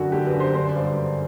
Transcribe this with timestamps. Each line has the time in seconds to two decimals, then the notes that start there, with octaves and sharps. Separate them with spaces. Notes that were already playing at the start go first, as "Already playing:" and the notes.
Already playing: F#2 D3 F#4
0.12 D3 G4
0.26 B4
0.33 F#2
0.40 C5
0.54 D3 C5
0.68 D5
0.75 G2
0.83 C5
0.96 D3 D5